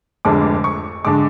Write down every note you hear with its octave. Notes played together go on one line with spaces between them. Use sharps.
F1 F2 D3 G#3 D6
C#6
D3 G#3 D6